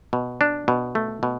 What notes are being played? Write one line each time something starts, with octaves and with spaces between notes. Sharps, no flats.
B2
D4
B2
A3
B2